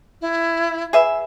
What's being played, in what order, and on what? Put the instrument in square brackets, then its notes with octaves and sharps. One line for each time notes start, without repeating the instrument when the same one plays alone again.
[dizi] E4
[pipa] G#4 B4 E5